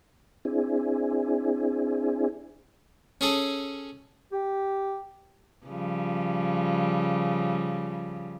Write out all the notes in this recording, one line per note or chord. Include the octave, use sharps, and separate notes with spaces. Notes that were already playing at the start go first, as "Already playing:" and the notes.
C4 D4 E4 G#4
C#4 G#4 A4
G4
C#3 F3 G3